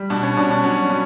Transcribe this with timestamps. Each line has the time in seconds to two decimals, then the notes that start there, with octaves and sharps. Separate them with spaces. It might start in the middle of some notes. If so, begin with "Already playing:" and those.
Already playing: G3
0.10 B2 D4
0.23 C#4
0.37 B2 D4
0.51 D4
0.63 F#3 C#4
0.90 B3